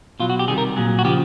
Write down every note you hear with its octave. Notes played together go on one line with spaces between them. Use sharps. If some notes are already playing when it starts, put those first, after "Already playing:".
B2 F#3 F4
F#4
G4
C3 D#3 G3 G#4
A#4
A#2 F#3 G#4
F#4
C#3 F3 G4